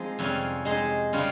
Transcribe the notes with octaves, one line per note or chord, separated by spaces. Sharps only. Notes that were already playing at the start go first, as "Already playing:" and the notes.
Already playing: F3 G#3 C4 D#4
F2 C3 G3 C#4 G#4
G#3 D#4 G#4 C5
C#3 G3 C#4 F4